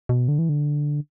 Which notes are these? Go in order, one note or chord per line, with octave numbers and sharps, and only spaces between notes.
B2
D3
E3
D3